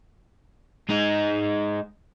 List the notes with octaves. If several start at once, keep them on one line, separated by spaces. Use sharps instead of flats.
G#3 D#4